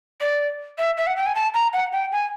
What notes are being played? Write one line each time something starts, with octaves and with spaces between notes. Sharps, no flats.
D5
E5
E5
F#5
G5
G#5
A5
A#5
F#5
G5
G#5